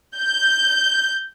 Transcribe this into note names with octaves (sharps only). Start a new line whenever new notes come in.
G6